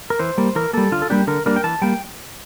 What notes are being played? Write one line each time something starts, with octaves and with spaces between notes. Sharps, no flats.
A#4
E3 C5
G3 A#3
E3 A#4
G3 A#3 A4
D3 F4
A4
G3 A#3 D4 G4
D3 A#4
G3 A#3 D4 A#4
G5
E3 A5
G3 A#3 G5